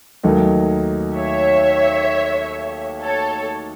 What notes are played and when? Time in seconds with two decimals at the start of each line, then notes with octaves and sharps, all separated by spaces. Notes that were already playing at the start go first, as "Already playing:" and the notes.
0.23 D#2 D#3 F#3 A3 D#4
1.15 C#5 E5
3.02 A4 C#5